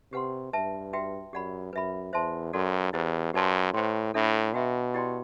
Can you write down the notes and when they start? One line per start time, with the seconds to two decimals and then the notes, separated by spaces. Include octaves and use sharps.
0.12 C3 G4 B4 F#5 C6
0.53 G2 B4 E5 A5
0.93 F#4 B4 E5 G5
1.33 F#2 G4 D5 F#5 B5
1.73 F#2 B4 E5 B5
2.13 E2 C5 E5 A5 C6
2.53 F#2 F#4 A4 D5
2.93 E2 E4 G4 C5
3.33 F#2 G4 B4 D5 A5 C6
3.73 A2 C5 G5 C6
4.14 A2 D4 A4 E5 B5
4.53 B2 F#4 B4 E5 G5
4.94 E4 G4 D5 G5 C6